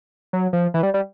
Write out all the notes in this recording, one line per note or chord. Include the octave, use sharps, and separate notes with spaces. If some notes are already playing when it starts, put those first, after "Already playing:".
F#3
F3
E3
G3
G3